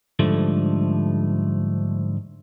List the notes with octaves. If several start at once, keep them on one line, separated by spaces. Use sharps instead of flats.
G#2 D3 F3 G3 A3